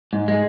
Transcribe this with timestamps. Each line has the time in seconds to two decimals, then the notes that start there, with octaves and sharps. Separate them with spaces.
0.13 G#2
0.28 G#3